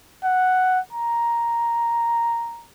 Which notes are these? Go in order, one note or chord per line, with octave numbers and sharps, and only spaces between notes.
F#5
A#5